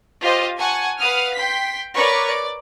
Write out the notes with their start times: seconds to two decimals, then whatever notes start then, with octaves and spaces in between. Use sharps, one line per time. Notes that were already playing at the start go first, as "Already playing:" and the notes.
0.21 F4 G4 C5 D#5
0.58 F#5 G#5 A5 C#6
0.99 B4 F5 F#5 D#6 F6
1.34 G5 C6 B6
1.95 A#4 B4 C#5 D5 C#6
2.27 D5